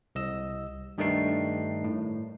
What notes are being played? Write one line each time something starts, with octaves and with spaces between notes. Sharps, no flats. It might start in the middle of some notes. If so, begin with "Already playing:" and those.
C2 D#5 E6
G2 D#3 A3 D4 D#4 C7
A2